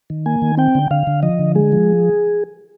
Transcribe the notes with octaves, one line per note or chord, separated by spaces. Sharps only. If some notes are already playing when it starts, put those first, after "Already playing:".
D#3
A#3 G#5
D#3
C4 G5
D3
D3 F5
D3
F3 D#5
D3
G#3 G#4
F3